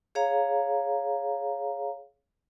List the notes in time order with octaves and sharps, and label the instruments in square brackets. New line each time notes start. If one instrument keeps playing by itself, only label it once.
[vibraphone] G#4 C#5 F5 A#5